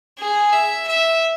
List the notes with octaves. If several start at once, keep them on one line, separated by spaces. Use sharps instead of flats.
G#4
E5
E5